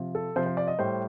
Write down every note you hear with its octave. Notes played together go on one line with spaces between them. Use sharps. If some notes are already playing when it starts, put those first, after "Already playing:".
Already playing: C3 F3
A4
C3 F3 C5
C5
D5
D#5
A2 G3 C5